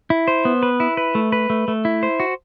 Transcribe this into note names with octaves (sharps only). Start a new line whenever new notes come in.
E4
C5
B3
B4
E4
B4
A3
B4
A3
A3
E4
C5
F#4